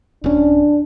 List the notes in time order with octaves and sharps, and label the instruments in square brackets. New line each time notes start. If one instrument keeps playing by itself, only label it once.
[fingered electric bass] D#1 C#4 [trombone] D4